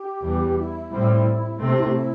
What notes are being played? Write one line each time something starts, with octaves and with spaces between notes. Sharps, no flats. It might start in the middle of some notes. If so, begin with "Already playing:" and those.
Already playing: G4
E2 E3 G3
E4
A2 G3 C4
C3 A3 C4 E4
G4
E4
G4
E4